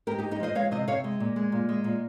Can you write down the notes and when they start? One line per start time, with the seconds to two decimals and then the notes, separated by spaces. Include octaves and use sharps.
0.07 G#2 G4 A#4
0.18 D#4 G4
0.23 G#3
0.31 D#4 G4
0.40 F3 C5 D#5
0.55 G#3 C#5 F5
0.71 C3 C5 D#5
0.88 C3 C#5 F5
1.04 G#3
1.20 A#2
1.36 G#3
1.52 A#2
1.69 G#3
1.84 A#2